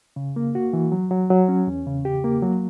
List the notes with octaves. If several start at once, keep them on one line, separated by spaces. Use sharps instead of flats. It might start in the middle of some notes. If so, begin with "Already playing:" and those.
C#3
A#3
F#4
E3
F#3
F#3
F#3
C#4
E2
C#3
G4
A#3
F#3